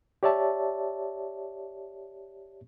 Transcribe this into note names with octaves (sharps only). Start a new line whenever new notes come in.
G4 C#5 D5 E5 A5